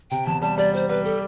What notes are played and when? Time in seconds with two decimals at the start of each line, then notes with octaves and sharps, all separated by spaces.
0.11 C3 G5
0.27 E2 A5
0.42 G3 A5
0.58 G3 D5
0.74 G3 C5
0.89 G3 B4
1.04 G4 A4